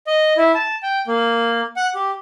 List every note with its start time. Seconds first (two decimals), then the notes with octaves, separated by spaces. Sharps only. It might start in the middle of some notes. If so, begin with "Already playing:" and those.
0.07 D#5
0.37 E4
0.55 A5
0.83 G5
1.08 A#3
1.76 F#5
1.95 G4